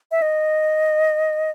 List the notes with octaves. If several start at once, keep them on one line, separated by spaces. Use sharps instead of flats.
E5
D#5